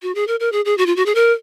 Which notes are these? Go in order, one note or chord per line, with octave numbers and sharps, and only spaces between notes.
F#4
G#4
A#4
A#4
G#4
G#4
F#4
F4
F#4
G#4
A#4